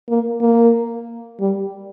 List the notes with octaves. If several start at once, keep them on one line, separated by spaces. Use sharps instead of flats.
A#3
A#3
G3